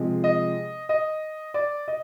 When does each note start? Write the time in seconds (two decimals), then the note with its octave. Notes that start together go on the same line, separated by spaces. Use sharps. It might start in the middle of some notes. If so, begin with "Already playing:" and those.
Already playing: C3 F3 G#3
0.24 D#5
0.89 D#5
1.54 D5
1.88 D#5